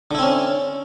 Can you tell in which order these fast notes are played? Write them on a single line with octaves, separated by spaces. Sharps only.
D3 E4 C4 C#4